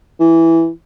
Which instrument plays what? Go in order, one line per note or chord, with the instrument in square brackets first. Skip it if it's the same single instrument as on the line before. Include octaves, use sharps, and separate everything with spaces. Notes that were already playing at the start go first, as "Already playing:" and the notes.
[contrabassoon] E3